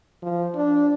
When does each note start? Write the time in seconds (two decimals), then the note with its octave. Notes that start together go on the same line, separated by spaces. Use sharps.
0.22 F3
0.55 D4